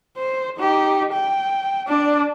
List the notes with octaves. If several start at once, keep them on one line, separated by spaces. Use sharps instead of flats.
C5
D#4 G4
G5
D4 D5